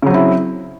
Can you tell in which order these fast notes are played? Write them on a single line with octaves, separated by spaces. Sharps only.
C#3 F#3 C4 E4